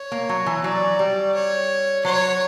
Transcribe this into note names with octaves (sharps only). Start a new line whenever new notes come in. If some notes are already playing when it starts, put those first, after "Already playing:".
Already playing: C#5
A#3
F#3
E3
F#3 D5
G3
C#5
F#3 C#5